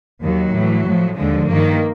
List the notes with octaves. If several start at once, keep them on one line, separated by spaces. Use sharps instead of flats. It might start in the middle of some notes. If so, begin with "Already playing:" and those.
D#2 D#3 F#3
A2 E3
A2 F3
D#2 D3 F3 G#3
G2 D#3 A#3